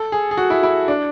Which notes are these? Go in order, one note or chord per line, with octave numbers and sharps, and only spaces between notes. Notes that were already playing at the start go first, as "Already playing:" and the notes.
Already playing: A4
G#4
G#4
F#4
E4
E4
D4